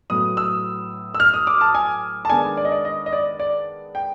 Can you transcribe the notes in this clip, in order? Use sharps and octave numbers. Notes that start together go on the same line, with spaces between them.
A2 F#3 B3 D#6
E6
E6
F6
D#6
D6
A5
G#5
A5
D#3 G#3 B3 D4 G#5
D5
D#5
D5
D#5
D#5
D5
D5
G5